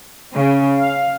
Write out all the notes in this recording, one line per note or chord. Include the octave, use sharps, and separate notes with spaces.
C#3
F5